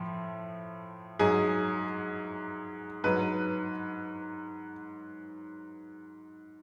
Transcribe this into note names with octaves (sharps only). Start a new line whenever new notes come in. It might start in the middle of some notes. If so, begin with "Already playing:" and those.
Already playing: A2 F3
G#2 F#3 G#4
G#2 F#3 B4